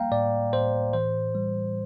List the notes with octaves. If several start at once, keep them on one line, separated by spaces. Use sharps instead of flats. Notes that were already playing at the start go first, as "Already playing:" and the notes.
Already playing: G3 A#3 F5 G5 A#5
A2 D5
A2 C5
E3 C5
G3